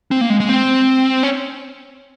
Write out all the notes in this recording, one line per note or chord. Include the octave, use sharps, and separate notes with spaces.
C4
A#3
G#3
G#3
C4
C#4